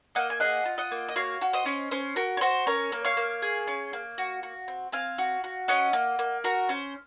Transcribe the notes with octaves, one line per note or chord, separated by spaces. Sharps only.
A#3 D#5 F#5
G#5
G#4 D#5 F#5
F4
D#5 F#5
A#3
D#5
F#4 C#5 F5
F#4
C5 D#5
C#4
C#4 C5
F#4 A#4
C#5
F#4 C5
C#4 A#4 C#5
A#3
C#5 F5
A#3
G#4
C#4
A#3
F#4
F#4
C4
C4 F5 G#5
F#4
F#4
C#4 D#5 F#5
A#3
A#3
F#4 A#4
C#4 C5